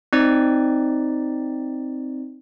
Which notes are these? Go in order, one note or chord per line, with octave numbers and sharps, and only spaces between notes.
C4 D#4 D5